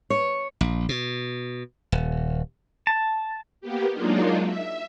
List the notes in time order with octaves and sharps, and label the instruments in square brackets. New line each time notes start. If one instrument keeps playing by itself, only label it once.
[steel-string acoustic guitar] C#5
[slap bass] A#1
B2
D#1
[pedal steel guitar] A5
[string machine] A#3 B3 G4
F#3 G#3 A#3 D4 D#4 F4
E5